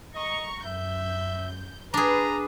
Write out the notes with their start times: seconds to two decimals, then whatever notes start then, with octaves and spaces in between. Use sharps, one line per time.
0.15 D#5 A#5 C#6
0.66 F#2 E5 G6
1.94 D4 G#4 B4 A#5